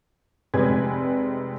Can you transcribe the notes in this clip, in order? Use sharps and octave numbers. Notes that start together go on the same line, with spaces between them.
F1 C3 G#3 B4 G#5 G#6